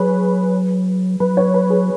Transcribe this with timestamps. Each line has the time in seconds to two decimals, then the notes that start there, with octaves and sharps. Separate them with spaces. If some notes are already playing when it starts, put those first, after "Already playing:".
Already playing: F#3 G#4 B4 C#5
1.20 F#3 B4
1.37 C#5
1.54 B4
1.70 G#4